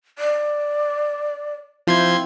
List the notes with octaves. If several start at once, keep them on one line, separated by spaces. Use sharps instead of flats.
D5
F3 C4 E4 C5 C6 G#6